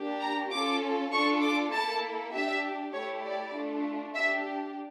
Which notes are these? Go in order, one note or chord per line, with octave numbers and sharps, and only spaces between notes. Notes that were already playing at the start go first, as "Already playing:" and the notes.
Already playing: A#3 D4 G4
A#5
C#4 F4 A4 D6
D4 F4 A4 C#6
D6
A#3 E4 A4 A5
D4 G4 E5
A3 E4 G4 C#5
D5
A3 D4 F4
D4 G4 E5